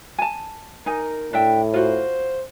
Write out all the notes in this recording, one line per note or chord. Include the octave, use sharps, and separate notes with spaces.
G#5 A5
D#4 A#4 G#5
A2 D4 E5 G5
F4 F#4 C5